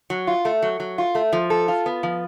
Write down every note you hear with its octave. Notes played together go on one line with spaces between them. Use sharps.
F#3
F4
A3
F#3
F#3
F4
A3
F3
A4
F4
B3
F3